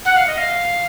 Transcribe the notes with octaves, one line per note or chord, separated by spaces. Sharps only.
F#5
F5
D#5
F5